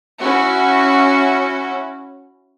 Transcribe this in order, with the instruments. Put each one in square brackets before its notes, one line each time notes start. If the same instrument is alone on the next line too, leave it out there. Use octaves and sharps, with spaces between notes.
[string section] C#4 E4 F#4